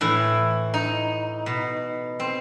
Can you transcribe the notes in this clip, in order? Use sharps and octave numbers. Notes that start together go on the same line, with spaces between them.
A2 E3 E4
D#4
B2
C4